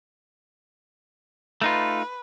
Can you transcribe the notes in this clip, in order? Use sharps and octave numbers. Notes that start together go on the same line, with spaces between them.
A3 D#4 F4 B4